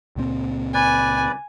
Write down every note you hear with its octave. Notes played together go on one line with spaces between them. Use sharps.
C#2 A#2 C4
B4 D5 G#5